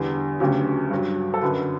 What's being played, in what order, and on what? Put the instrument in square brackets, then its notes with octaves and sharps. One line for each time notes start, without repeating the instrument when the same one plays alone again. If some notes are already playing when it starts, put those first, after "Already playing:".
Already playing: [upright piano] E2 D3 G3 G4
D2 C#3 F#3 G4
G2 F#3
A4
F#2 D3 F#3 B4